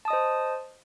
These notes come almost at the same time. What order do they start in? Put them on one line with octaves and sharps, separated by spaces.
A5 D#6 D#5 C5